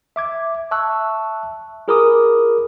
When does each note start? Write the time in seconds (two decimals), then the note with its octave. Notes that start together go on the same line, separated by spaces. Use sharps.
0.16 E5 D6 G#6
0.71 E5 A5 C#6 E6 F#6
1.88 F4 G#4 A#4 B5 D6 D#6